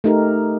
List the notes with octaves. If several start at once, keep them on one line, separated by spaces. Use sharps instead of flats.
A3 D#4 G4 A#4